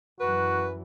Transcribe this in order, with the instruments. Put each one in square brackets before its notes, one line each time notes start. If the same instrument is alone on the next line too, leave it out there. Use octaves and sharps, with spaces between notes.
[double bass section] F#2 E3 F#3 [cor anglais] F#4 [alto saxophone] B4